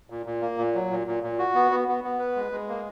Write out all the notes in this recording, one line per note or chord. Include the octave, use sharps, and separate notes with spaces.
A#2
A#2
A#3
A#2
F#3
A#2
A#2
A#2
F#4
B3
B3
B3
B3
B4
G#3
G#3
A#3